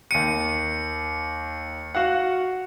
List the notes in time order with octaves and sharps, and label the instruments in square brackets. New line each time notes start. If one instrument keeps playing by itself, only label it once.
[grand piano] D#2 D#7 [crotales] C#7
[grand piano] F#4 F5 F#5